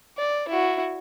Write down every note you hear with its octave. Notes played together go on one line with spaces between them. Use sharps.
D5
E4 F#4